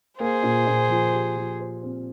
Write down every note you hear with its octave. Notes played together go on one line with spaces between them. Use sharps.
A#3 G#4 C5
A#2
A#2
F3
G4
F3
C5
C4